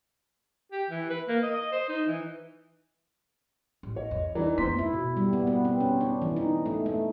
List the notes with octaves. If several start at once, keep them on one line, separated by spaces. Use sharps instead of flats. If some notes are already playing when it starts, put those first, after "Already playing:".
G4
E3
B4
A#3
D#5
D#5
C5
D#4
E3
A1
C#5 D#5
E2
E3 D4 D#4 D5 A#5
E2 A3 B3 C4 C5 C6 B6
E4
B2
G3
B3
B3
C4
C#4
D4
E3
D#4
A3
A3